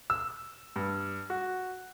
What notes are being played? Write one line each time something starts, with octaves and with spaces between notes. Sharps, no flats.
E6
G2
F#4